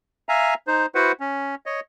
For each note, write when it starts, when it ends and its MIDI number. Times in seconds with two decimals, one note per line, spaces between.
0.29 0.54 76
0.29 0.54 77
0.29 0.54 80
0.29 0.54 82
0.67 0.86 63
0.67 0.86 72
0.95 1.12 64
0.95 1.12 66
0.95 1.12 71
0.95 1.12 72
0.95 1.12 78
1.20 1.55 61
1.66 1.80 73
1.66 1.80 75